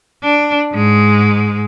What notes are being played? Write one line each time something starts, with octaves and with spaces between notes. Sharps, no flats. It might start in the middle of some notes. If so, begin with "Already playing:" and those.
D4
G#2 G#3